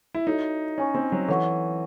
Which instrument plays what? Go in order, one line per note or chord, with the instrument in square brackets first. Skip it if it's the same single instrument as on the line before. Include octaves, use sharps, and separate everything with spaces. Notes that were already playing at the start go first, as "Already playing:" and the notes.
[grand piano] E4
[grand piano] D#4 [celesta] F#4 A4 C#5 E5
[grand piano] C#4 [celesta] C#5 G#5 C#6
[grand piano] C4
F#3
[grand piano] E3 [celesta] A4 C#5 F#5 C#6